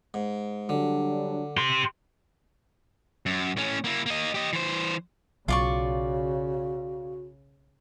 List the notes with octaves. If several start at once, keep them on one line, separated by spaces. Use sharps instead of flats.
G#2
D3 F#3 G3 D4
G4 C6
F#2
A2 C#4
A#3 E4
A#3 D#5
G4 D#5
E3 C5
B1 C#3 F4 F#4 D5 C#6